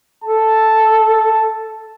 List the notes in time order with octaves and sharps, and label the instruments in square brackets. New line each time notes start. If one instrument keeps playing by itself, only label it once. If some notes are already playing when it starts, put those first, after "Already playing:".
[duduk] A4 [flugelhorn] A5